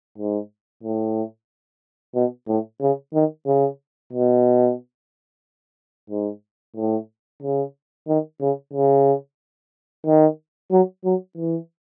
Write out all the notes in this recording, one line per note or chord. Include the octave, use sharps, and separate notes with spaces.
G#2
A2
B2
A2
C#3
D#3
C#3
B2
G#2
A2
C#3
D#3
C#3
C#3
D#3
F#3
F#3
E3